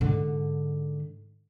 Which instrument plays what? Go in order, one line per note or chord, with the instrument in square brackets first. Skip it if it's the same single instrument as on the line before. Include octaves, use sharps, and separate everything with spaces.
[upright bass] G#2 D3